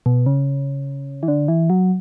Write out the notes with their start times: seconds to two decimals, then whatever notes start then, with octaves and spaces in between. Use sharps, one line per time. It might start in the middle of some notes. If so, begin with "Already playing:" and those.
0.06 B2
0.26 C#3
1.23 E3
1.28 D3
1.48 E3
1.70 F#3